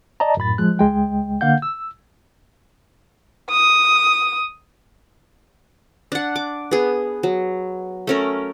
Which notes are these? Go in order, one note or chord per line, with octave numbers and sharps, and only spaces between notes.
D5 D#5 A5 A#5
F#2 A2 B5 A6
F3 G#3 F#6
C#2 G#3 G5
D3 A#3 F5 F#5 G6
E6
D#6
D4 F#5
D6
B3 G#4
F#3
A3 C#4 A#4